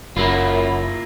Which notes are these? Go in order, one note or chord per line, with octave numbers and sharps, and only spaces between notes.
F#1 F#2 A#3 E4 F4 B5